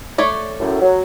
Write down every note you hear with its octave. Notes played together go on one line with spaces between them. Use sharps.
A3 C#5 D5
F#2 A2
F#3